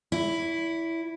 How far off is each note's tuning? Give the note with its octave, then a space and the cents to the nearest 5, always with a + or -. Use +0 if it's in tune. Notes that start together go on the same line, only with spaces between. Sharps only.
E4 +0 D5 -45